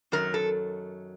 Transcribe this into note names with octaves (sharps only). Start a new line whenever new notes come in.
F#2 D#3 F#3 A#4
A4